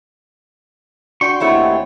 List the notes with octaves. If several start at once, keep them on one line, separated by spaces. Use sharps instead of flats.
D4 F#4 G5 C6 C#6
D#2 A3 C4 E4 C#5 F#5